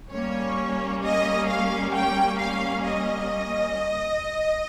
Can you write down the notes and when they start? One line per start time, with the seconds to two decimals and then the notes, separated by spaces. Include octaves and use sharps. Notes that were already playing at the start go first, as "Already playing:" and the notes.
0.12 G3 A#3 C#4 C#5
1.03 D#5
1.47 F5
1.93 G5
2.38 F5
2.84 D#5